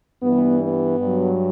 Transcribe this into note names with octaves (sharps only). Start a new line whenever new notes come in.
G2 E3 G3 B3
B3
G2 F#3